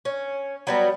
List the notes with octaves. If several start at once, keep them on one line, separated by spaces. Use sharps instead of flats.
C#4
F#3 G3 B3